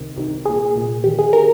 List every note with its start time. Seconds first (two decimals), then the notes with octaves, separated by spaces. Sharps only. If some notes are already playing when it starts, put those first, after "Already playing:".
Already playing: C2 C3 D#3
0.17 C2 C3 D#3
0.45 C2 A#2 G#4
0.76 C2 A#2
1.04 D#2 D#3 G4
1.19 G#4
1.33 D#3 A#4